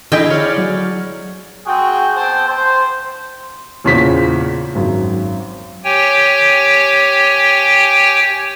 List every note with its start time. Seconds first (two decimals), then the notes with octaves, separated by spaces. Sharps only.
0.12 D3 E4 G#4 D#5 F5 G5 G#5
0.30 C#5 D5 F6
0.58 F#3
1.66 C4 F#4 G#4 F#5 G5
2.16 B3 C4 C5 G5 A5
2.48 C5
3.85 E2 A#2 C#3 F4 C5 B6
4.75 G#1 F#2
5.84 G4 C#5 G5 G#5